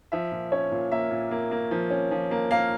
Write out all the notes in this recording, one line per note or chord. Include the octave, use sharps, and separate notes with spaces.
F3 E5
A#2
C#4 C#5
A#2
A#3 E5
A#2
A#3
A#3
F3
C#4
F3
A#3
A#3 F5